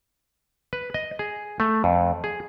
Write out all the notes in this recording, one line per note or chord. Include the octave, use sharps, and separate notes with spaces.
B4
D#5
G#4
A3
F2
G#4